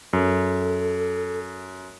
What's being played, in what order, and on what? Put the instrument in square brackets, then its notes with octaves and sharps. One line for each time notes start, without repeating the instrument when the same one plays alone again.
[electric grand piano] F#2 [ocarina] A4